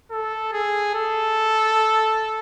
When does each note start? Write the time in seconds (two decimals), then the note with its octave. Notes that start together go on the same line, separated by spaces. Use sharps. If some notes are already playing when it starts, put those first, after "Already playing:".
0.11 A4
0.53 G#4
0.95 A4